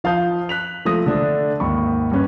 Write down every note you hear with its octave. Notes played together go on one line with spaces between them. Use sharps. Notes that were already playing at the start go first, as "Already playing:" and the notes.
F3 F5 A5 D#6 G6
F#6 B6 F7
F3 A3 D#6 A#6
D3 A3 D4
G#1 D#2 B5 C#6
G2 C#4 B4